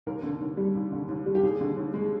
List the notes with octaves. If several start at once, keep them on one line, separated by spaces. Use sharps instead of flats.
D#2 A#4
D3
D#2
G3
D#2
D3
D#2
G3
G4
D#2 G#4
D3
D#2
G#3